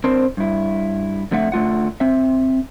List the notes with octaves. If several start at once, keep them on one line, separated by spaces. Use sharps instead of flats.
C4 D4 A#4 C5
G2 E4
F2 D3 A3 E5 F#5
D3 A3 F4 F#5
C4 E5